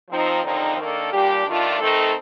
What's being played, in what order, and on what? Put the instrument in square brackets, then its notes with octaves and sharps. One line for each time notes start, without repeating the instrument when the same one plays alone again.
[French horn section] F3 C4 D#4
D#2 D3 F3 C4 D#4
D#3 A#3 D4 A4
A#2 G3 D4 G4
G2 D#3 A3 D4 F4
D#3 A3 C4 D#4 A4